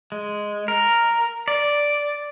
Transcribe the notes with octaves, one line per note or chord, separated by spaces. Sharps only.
G#3
A#4
D5